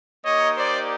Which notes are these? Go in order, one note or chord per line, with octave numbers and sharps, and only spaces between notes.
A#3 D#4 G4 C#5 D#5
C5 D5